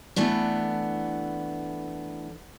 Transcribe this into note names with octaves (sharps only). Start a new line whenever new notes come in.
E3 A3 B3 D4